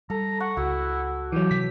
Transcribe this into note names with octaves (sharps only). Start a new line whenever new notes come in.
G3 A4 A#5
F#5 C#6
C#2 E4 F#4
E3 F#3 G4
C3 D#3 E3 B6